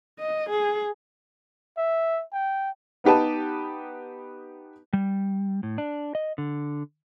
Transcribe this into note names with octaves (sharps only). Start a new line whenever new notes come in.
D#5
G#4
E5
G5
B3 D#4 G4 B4 A5
G3
A2
D4
D#5
D3